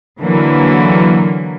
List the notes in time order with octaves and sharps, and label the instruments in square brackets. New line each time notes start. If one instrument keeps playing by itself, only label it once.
[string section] D3 E3 F#3 A#3